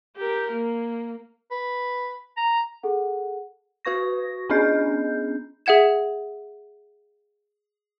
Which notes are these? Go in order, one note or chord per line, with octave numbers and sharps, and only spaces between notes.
G4 A#4
A#3
B4
A#5
G#4 A4 F#5
F#4 B4 C#6 A#6
B3 C#4 D4 G#4 D#5 G6
G#4 E5 F#5 G#6 E7